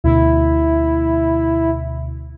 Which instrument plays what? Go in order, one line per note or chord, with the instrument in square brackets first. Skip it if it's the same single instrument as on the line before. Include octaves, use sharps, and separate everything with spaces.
[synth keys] D2 B2 [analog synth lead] E4